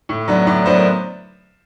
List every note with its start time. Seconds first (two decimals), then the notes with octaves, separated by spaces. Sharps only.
0.09 A2
0.28 F#3 B3 D4
0.47 A2 D5
0.66 F#3 B3 D4 C5
0.75 A#4